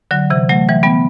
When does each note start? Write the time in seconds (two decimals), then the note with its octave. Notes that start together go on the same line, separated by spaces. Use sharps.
0.11 D3 F#3
0.30 C3 E3
0.49 F#3 A3
0.69 E3 G3
0.83 G3 B3